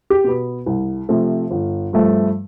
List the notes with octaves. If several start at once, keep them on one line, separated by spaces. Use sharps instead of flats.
G4
B2 B3
C2
C3 F3 A3 C4
G1
G2 F3 A3